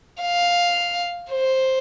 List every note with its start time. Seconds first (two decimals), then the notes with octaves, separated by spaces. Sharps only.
0.22 F5
1.32 C5